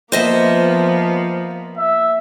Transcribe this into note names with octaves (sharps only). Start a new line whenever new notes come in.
F3 A#3 B3 C5 D#5 E5
E5